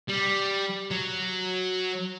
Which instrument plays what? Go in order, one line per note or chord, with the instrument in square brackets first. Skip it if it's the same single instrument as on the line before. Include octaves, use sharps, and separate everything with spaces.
[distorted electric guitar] G3
F#3